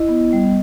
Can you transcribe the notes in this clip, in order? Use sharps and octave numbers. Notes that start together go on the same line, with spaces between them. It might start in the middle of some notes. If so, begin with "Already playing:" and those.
Already playing: E4 D#5
B3
G3